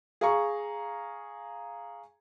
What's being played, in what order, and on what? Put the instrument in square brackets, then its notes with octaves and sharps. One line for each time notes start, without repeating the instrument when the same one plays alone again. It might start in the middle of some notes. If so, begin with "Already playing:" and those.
[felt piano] G#4 F5 A#5 C#6